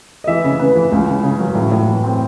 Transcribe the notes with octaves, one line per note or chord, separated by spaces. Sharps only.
D#5
E3 E5
C#3
C#3 B4
E3
C#2
C#3
C#3
F#3
A2
A2
E3
C4